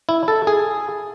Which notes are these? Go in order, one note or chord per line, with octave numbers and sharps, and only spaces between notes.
E4
A4
G#4